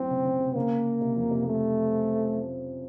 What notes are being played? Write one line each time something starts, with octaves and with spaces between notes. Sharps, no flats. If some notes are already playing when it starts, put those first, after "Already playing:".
Already playing: F#2 A2 C4
C#3
C#3
C3
C#3 A#3
C3
F2
C3
A3